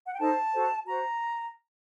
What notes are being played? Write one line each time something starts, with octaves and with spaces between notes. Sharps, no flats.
F#5
G5
D#4 A4 C5 A5
F#4 A4 C5
F#4 C5 A#5